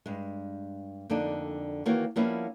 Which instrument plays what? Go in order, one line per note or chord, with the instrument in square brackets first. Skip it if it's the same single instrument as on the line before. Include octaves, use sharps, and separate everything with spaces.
[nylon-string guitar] G2 G#3
F2 D3 A#3 D4 D#4
D#3 E3 A#3 F#4 C#5
F3 G3 A#3 B3 C#4 E4